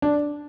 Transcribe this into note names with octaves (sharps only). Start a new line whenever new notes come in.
D4